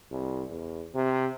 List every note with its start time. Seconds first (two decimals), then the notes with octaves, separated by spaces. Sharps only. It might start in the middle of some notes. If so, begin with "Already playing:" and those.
0.11 C2
0.50 E2
0.95 C3